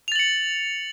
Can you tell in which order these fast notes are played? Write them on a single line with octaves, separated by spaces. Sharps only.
F7 A6 F#7 C#7